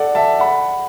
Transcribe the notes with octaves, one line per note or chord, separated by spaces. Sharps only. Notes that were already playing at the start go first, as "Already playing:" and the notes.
Already playing: A4 D5 F#5
E5 A5
F#5 B5